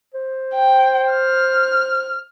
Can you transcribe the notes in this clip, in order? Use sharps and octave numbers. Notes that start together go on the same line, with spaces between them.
C5
G5
F6